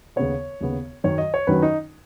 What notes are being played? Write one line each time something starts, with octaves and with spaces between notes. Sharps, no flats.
D#2 C#3 B3 C#5
D#2 C#3 B3
F#2 D#3 F#3 C#4 C#5
D#5
C#5
F#2 D#3 F#3 C#4 B4
D#4